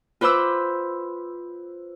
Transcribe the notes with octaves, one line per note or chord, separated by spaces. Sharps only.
F4 B4 C5 D6 E6